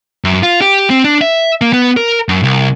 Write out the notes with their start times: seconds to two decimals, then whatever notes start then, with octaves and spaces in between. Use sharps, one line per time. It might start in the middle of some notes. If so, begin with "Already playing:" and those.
0.24 F#2
0.43 F4
0.61 G4
0.90 C4
1.04 D4
1.21 E5
1.61 A#3
1.73 B3
1.97 A#4
2.29 F#2
2.43 C2